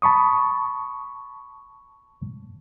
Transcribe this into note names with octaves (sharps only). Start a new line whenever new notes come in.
A5 B5 C#6 D#6